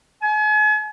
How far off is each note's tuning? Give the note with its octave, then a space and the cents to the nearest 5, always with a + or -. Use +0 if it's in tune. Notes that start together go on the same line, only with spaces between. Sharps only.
G#5 +40